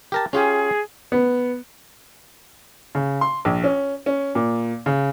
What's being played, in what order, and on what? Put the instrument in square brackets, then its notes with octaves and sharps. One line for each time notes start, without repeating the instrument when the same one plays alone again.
[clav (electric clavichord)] G4 A#4 A5
[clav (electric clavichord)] C#4 F4 G4 [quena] G#4
[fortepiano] B3
[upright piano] C#3
C6
A#1
C#4
C#4
A#2
C#3